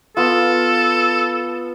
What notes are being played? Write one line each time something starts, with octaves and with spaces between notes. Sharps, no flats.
B3 F4 A4